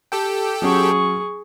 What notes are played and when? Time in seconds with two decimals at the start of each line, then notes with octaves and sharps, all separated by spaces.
0.12 G4 A4 G5
0.62 F#3 C#4 G#4 C#6